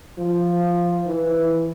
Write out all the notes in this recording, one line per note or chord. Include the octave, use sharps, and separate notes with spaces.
F3
E3